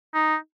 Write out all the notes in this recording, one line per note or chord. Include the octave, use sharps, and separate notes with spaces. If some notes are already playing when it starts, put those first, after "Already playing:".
D#4